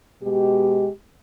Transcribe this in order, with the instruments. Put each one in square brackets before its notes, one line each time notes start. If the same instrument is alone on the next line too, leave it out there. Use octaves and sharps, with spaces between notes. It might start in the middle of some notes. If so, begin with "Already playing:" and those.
[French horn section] B2 G#3 G4